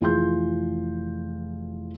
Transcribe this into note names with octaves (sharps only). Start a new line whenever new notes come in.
F1 E3 F4 G#4 C6 G6